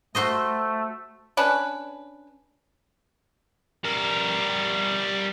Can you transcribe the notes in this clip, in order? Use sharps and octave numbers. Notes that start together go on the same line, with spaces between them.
A3 F#4 C5 D#5
C#4 D4 B4
G3 A#4